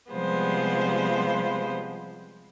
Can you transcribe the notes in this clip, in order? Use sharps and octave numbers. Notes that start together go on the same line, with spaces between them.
C3 F3 G3 G#3 B3 C5